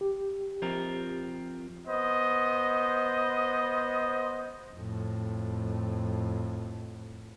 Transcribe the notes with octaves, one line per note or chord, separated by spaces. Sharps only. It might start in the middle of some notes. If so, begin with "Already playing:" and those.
G4
F3 C4 A#4
B3 C5 D#5
F2 A2